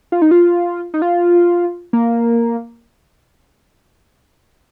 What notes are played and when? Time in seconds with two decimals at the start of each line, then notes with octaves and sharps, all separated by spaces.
0.12 F4
0.22 D#4
0.31 F4
0.94 D#4
1.02 F4
1.93 A#3